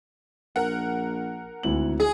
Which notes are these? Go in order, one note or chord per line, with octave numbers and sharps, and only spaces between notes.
A#1 A#4 F#5
G#1 D2 E4 F#7
G#4